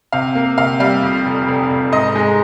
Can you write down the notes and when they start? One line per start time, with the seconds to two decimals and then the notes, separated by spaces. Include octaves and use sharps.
0.13 C3 F5
0.35 A#3
0.58 C3 F5
0.80 G3 F5
1.03 F2
1.25 F1
1.48 F1
1.70 F1
1.92 G#2 D#5
2.16 G#3